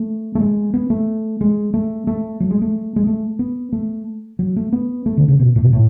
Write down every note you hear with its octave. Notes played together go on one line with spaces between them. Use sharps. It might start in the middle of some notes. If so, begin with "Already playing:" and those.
Already playing: A3
A3
G#3
B3
A3
G#3
A3
A3
F#3
G#3
A3
G#3
A3
B3
A3
F#3
A3
B3
A3
D3
C#3
B2
A2
B2
A2